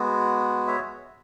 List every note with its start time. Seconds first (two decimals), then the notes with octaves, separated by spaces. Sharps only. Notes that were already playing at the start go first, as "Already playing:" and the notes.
Already playing: G#3 B3 F#4
0.67 C#5 E5